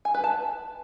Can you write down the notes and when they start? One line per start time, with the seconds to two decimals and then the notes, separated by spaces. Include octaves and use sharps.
0.05 G#5
0.14 B4
0.24 A5